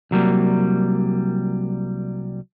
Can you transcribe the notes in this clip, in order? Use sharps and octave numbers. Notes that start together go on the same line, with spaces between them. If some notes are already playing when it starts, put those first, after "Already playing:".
C2 F#3 G3 A#3